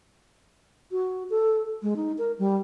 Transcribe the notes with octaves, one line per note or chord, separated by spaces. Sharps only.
F#4
A4
G#3
D#4
A#4
G3